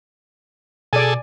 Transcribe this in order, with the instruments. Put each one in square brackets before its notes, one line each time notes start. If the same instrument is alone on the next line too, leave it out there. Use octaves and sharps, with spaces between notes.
[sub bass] B2 [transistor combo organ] G#4 A4 [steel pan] D5 G#5